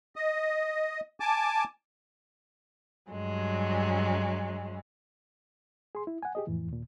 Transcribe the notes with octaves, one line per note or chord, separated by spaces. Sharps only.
D#5
G#5 A5 D6
G2 F#3 G#3
G#4 C6
E4
F#5 G#5
G4 G#4 D#5
F2 A2 E3
D#2 A#2